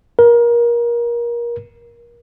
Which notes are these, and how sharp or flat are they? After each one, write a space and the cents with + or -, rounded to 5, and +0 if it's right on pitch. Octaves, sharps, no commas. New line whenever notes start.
A#4 +25